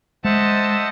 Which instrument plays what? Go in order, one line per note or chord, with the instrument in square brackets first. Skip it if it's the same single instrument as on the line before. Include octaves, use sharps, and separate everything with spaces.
[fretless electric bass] G#3 [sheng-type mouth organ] C5 E5 F#5 [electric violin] D#5 A5